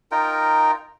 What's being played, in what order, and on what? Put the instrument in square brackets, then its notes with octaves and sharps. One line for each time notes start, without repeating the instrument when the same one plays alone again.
[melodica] D#4 F4 A#4 G5